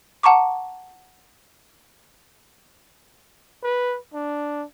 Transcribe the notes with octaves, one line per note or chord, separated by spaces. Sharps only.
F#5 A5 A#5 C#6 D6
B4
D4